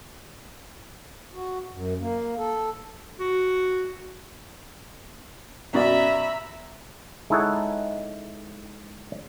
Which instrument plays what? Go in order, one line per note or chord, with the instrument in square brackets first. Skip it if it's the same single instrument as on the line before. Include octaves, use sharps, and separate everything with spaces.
[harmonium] F#4
F#2
A#3
A4
[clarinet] F#4
[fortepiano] F#2 B2 D5 [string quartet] E5 A#5 B5
[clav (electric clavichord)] G#3 D#4 E4 A4 C#5 F#5